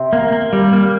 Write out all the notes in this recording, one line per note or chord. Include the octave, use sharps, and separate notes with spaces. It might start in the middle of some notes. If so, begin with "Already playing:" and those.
Already playing: C3 C4
A#3
A#3
G3
A#3